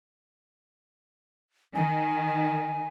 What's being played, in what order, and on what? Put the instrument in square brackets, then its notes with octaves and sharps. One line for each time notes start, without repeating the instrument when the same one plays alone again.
[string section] D#3 [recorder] G#5